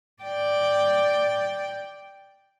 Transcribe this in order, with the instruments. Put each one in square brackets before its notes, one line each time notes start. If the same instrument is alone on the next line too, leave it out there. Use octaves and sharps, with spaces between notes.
[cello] D5 G5